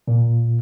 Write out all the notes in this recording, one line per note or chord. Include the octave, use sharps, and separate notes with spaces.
A#2